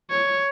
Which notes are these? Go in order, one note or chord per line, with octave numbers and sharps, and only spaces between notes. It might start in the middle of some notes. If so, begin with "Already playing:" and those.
C#5